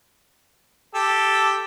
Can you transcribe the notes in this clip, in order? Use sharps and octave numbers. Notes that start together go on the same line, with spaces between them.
G4 A4